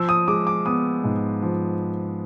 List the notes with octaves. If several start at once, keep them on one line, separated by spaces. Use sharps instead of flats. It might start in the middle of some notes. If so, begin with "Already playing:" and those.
Already playing: F3 E6
D#6
G#3 D6
D6
B3 D#6
G#2
F3